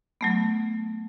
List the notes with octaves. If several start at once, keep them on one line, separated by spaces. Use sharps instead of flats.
F#3 A3 B3